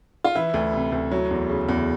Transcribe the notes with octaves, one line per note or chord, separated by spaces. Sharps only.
F4
E3 E4
D2
C3
D2
F#3
E2
C#3
E2